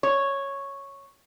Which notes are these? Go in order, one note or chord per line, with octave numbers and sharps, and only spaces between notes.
C#5